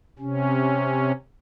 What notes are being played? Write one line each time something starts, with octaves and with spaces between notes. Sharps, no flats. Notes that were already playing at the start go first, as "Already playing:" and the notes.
C3 C#4